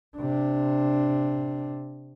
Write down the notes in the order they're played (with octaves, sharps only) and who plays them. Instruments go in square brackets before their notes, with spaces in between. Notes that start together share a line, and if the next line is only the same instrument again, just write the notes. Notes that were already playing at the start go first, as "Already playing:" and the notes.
[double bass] C3 D4